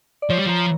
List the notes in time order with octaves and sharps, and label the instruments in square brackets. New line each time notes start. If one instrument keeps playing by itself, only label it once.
[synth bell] D5
[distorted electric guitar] F3 [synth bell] C#5
[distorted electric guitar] G3
[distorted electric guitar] F3 [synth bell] A#5